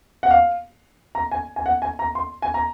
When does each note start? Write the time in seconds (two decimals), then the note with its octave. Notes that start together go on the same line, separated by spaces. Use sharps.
0.23 F#5
0.31 F5
1.15 A#5
1.31 G#5
1.56 G#5
1.66 F#5
1.82 G#5
1.99 A#5
2.15 C6
2.42 G#5
2.54 A#5